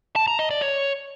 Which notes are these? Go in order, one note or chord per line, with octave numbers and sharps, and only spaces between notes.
A5
A#5
D#5
D5
C#5